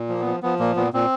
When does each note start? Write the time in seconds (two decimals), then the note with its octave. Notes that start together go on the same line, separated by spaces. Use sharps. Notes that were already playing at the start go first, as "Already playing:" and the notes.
Already playing: A#2
0.09 F3 A#3
0.20 B3
0.26 F3
0.43 F3 B3
0.60 A#2 A#3
0.76 A#2 B3
0.93 A#2 C4